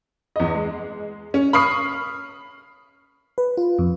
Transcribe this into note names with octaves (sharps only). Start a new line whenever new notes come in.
E2 D#5
G#3
C#4
B5 C#6 D#6 F6 C7
B4
F4
F2